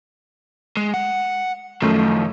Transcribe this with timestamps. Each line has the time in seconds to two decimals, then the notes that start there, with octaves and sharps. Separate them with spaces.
0.77 G#3
0.94 F#5
1.82 F#2 D#3 F3 A3